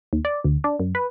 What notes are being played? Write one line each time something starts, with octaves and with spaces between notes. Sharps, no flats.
D#2
D5
D2
D4
F#2
B4